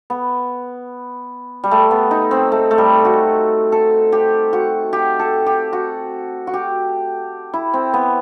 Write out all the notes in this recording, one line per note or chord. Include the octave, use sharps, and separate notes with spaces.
B3
G3
A3
B3
D#4
C4
A3
A3
G3
F#4
A4
G4
F#4
G4
A4
G4
F#4
F#4
G4
E4
C4
B3